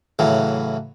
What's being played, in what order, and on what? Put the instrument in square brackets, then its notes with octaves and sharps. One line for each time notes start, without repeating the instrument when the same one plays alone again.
[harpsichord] A2 C#3 E3 F#3